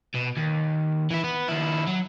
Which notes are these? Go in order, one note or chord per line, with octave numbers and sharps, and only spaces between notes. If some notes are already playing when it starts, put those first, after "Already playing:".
B2
D#2
E3 E4
B3
D#2 E4
F#3